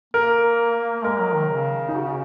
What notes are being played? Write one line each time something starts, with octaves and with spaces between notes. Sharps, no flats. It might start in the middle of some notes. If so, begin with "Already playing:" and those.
A#3 A#4
G#3 A#4
F#3
D#3
C#3
D#4
F#4